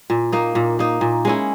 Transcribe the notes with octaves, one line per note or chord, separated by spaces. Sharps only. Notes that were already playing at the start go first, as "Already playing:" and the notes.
A#2
A#3 D#4
A#2
A#3 D#4
A#2
G#3 C#4 E4